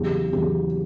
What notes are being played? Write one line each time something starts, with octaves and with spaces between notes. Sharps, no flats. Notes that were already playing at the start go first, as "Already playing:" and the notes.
Already playing: E2 C#3 F#3 G4
E2 C#3 F#3 G4